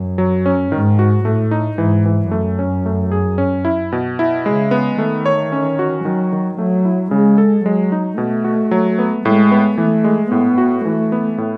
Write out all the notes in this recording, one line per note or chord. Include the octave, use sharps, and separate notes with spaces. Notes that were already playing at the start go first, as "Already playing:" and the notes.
Already playing: F#2
F#3
C#4
G#2 D#3
F#4
A2 A3
D#4
G#2 E3
E3
F#2 A3
C#4
A3
G#4
C#4
E4
B2
E4
C#3 G#3
B3
D#3 A3
C#5
C#4
F#4
D#3 F#3
D#3
F#3 A3
E4
C#3 G#3
A4
F#3 G#3
D#4
B2 A3
F#4
F#3
B3
A2 G#3
B3
E3 A3
G#3
A2 B3
F#4
E3 A3
B3
A2